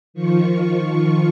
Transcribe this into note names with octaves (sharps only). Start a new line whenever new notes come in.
D#3 F3 F4 C#6